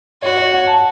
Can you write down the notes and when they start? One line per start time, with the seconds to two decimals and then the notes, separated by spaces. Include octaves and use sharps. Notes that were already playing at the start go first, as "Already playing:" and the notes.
0.22 F#4 C#5
0.37 C#5
0.52 F#5
0.67 A5